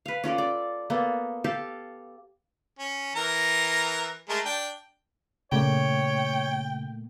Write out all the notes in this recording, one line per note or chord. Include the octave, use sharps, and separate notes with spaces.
B4 F5
C#4 F4 A4 D5
D5
A#3 B3 A4
G4 A4 F5 A5
C#4
E3 A#4 A#5
G#3 A3 A#4
D4 G5
A#2 C#3 A3 A#3 C#5 G5